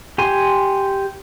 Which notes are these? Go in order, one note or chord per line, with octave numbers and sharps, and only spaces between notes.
G4 G#5 C6